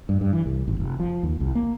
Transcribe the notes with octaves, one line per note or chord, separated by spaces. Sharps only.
G2
G2
E3
C2
G#1
F1
F3
D#2
C2
A#3